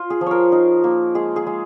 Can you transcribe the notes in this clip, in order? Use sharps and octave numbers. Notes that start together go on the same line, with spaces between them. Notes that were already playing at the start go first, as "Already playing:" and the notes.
Already playing: F4
G#4
F3
A#4 C#5
D#4
A#3
G#3 G#4
G#4
G#3